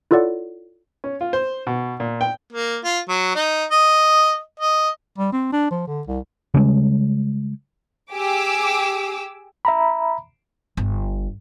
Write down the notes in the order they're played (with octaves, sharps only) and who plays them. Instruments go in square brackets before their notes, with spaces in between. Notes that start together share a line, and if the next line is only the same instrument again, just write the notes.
[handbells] E4 F4 A4 C#5 D5 F#5
[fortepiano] C#4
F4
C5
B2
A#2
G5
[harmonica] A#3
F4
F#3
D#4
D#5
D#5
[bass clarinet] G3
C4
D4
F3
D3
C2
[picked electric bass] C#3 G3 G#3
[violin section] G4 G#4 D6 E6
[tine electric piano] E5 A#5 B5
[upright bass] G1